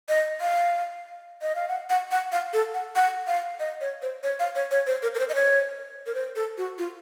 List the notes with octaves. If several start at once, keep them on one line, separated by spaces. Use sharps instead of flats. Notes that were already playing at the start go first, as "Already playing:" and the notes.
D#5
F5
D#5
F5
F#5
F#5
F#5
F5
A4
F#5
F#5
F5
D#5
C#5
C5
C#5
F5
C#5
C#5
C5
A#4
A#4
C5
D#5
C#5
A#4
C5
A4
F#4
F4